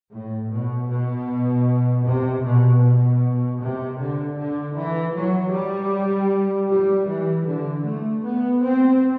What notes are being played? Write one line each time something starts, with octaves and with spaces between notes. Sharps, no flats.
A2
B2
B2
C3
B2
B2
C3
D3
D3
E3
F#3
G3
G3
E3
D3
A3
B3
C4